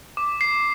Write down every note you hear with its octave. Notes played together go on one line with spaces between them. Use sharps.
D6
C7